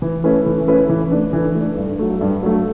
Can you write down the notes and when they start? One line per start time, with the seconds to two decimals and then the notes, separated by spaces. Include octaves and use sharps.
0.02 E3
0.24 A3 C#4 E4 B4
0.46 E3
0.68 A3 C#4 E4 B4
0.89 E3
1.11 A3 D4
1.33 E3
1.55 A3 D4
1.77 G2
1.99 F#3 A3
2.21 G2
2.43 F#3 A3